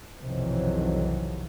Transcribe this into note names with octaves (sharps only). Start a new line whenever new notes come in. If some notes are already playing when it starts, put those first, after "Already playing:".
B1 F2 C3 D#3 E3 F#3